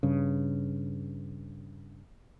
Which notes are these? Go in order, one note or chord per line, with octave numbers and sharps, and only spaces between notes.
G2 C#3